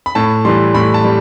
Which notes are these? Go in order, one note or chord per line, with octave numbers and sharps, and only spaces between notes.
B5
A2 A5
E3 G3 C6
A2 B5
A5
G3